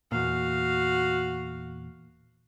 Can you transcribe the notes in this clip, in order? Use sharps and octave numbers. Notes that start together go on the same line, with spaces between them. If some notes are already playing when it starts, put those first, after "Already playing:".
E2 A#2 F#4 F5